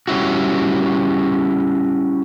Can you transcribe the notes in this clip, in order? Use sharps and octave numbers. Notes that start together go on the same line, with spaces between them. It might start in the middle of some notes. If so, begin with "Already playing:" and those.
G3 C#4 E4 F#4